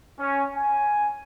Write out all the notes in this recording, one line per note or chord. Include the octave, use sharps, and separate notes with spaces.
C#4
G#5